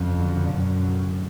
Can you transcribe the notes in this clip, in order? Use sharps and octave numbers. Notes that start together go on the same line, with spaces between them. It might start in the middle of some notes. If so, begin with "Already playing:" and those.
Already playing: F2 C#3 F3
D3 F#3
B2 D3
F#2
A2 C#3